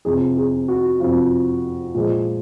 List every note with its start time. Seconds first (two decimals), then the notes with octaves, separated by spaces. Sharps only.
0.05 F2 C3 F3 G#4
0.37 G#4
0.68 F#4
1.00 F2 C3 F3 F4
1.95 A#2 F3 G#3